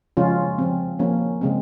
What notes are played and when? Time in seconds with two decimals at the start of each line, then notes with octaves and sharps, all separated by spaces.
0.17 C#3 F3 G#3 C#4 F4
0.58 F3 C4
0.99 F3 A#3 C#4
1.41 C#3 G#3 C4